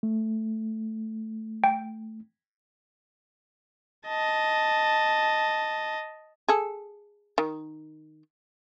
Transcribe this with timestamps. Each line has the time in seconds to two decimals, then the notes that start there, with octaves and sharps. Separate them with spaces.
0.03 A3
1.64 G5
4.08 D#5 A5
6.48 G#4 A4
7.38 D#3